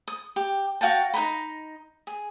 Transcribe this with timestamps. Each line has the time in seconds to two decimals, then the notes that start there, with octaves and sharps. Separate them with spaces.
0.08 D#6
0.36 G4
0.81 F#4 F5 G5 A5
1.14 D#4 C5 A#5 B5
2.07 G#4